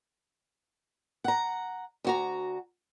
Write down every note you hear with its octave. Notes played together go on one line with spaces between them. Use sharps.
F#5 A#5
D2 F#4 A#5